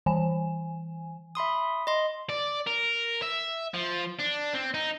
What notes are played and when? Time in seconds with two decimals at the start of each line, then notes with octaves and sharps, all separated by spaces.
0.06 E3 G#5
1.35 E5 B5 C6 D#6
1.87 D#5 C6
2.29 D5
2.67 A#4
3.23 E5
3.74 F3
4.19 D4
4.54 C4
4.74 D#4